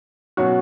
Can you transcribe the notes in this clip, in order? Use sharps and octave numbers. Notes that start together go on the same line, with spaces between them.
B2 F#3 C#4 F#4